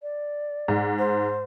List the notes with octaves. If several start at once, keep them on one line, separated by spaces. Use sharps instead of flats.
D5
G#2
C5